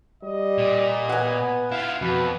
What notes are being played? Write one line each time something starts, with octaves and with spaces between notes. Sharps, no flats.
G3 D#5
A#2
B3 F#5 G#5
E4 F4 F5
F2 B2 B4